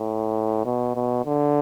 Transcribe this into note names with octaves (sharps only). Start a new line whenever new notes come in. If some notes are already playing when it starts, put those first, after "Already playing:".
Already playing: A2
B2
B2
D3